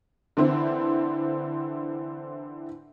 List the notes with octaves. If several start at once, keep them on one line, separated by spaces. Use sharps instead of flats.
D3 E3 C4 E4